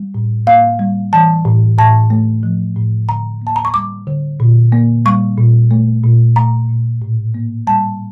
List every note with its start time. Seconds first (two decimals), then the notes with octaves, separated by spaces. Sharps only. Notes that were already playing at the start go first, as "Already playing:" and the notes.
Already playing: G3
0.15 A2
0.47 A#3 F5
0.79 G3
1.13 E3 A5
1.45 A2
1.78 A2 A5
2.10 A3
2.43 F3
2.76 A2
3.08 D3 A#5
3.42 A#3 A5
3.56 A#5
3.65 C#6
3.74 G3 D6
4.07 D3
4.40 A#2
4.72 A#3
5.05 G3 C#6
5.38 A#2
5.71 A3
6.04 A#2
6.36 A3 A#5
6.69 A#2
7.02 A2
7.34 A#3
7.67 G3 A5